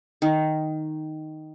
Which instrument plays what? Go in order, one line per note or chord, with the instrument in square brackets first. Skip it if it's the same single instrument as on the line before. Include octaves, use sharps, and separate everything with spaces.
[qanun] D#3